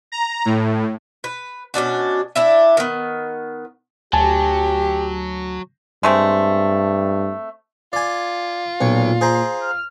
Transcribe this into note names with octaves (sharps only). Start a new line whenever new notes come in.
A#5
A2
B4
B2 C#4 D4 F#4
D4 E4 E5
D#3 B3
D2 F#3 G4 G#5 A5
G2 G#3 A3 C4
F4 D5 G#5
B1 A#2 C#5
G#4 C5 A#5
F6